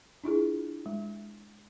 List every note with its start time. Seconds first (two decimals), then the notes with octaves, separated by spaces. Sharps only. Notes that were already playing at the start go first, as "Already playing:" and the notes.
0.24 D4 E4 F4 G#4
0.86 G#3